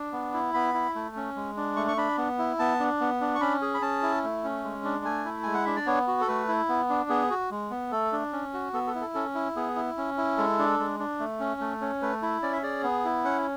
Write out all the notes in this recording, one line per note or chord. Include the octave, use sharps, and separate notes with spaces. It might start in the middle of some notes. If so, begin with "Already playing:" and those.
Already playing: D4
B3
E4
B3 B5
E4
A3
C#4
G#3
D4
A3 C#6
C#6
D4 B5
B3
E4
B3 A5
D4
B3
D4
C#6
C#4 B5
G#4
B5
C#4 A5
E4
A3
C#4
G#3
D4
A3 G#5
E4
G#3 G#5
F#5
D4 E5
D5
B3 C#5
F#4
A4
A3 B4
E4
B3
D4
B3 G#4
F#4
G#3
B3
A3 A4
D4
C#4
F#4
B3 A4
A4
E4
A4
C#4 A4
E4
B3 G#4
E4
C#4
E4
G#3 A4
D4
G#3
D4
A3
C#4
A3
C#4
A3 B4
E4
C#4 D5
E5
G#4 D5
B3
E4
C#4 F#5